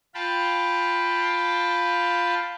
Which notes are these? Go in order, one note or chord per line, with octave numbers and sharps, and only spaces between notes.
F4 F5 G5 A5 B5